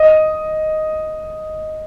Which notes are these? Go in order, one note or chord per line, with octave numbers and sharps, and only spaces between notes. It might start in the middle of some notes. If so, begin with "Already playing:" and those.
Already playing: D#5